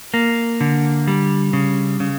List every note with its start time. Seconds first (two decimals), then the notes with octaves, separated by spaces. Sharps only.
0.14 A#3
0.61 D3
1.08 G3
1.53 C#3
2.00 C#3